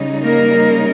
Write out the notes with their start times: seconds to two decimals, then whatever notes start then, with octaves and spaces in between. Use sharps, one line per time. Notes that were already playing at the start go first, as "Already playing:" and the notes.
Already playing: C#3 G3 D#4
0.23 A#3 A#4